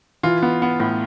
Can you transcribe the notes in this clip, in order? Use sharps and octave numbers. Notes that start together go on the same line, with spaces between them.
E3 F4
B3
B3
A2